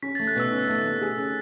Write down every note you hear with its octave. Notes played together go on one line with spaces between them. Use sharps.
C#4 B6
A6
A3
F#6
B2 E6
C#4
A3
A3
G#4
C#4